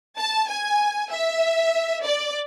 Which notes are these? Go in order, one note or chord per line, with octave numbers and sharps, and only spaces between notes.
A5
G#5
E5
D5